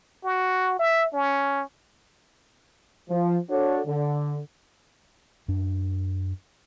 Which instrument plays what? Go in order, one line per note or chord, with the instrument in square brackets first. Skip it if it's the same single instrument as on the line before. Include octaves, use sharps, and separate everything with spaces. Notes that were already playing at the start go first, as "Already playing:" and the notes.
[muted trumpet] F#4
E5
C#4
[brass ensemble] F3
D4 F#4 A4 C#5
D3
[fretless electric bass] F#2 D4